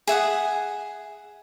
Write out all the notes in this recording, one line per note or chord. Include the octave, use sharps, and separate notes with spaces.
G#4 E5 F#5 D#6